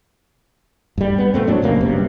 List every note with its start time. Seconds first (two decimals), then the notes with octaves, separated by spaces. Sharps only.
0.98 G2 G3
1.18 B3
1.34 E1 A#2 A3 C4
1.47 A2 F#3 D4
1.62 C#2 F#2 B2 A#3
1.81 F#1 G2 C3